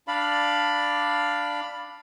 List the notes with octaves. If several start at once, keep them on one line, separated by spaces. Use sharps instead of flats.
D4 D5 F5 B5